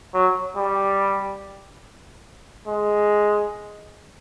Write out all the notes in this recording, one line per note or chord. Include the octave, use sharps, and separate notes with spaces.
F#3
G3
G#3